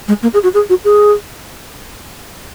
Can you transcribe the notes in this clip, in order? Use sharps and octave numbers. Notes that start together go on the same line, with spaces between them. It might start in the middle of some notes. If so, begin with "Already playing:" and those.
G#3
A#3
G#4
F#4
G#4
F#4
G#4